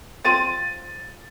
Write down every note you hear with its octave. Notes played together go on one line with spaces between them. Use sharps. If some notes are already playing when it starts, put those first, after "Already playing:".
F3 C4 F4 A6 D#7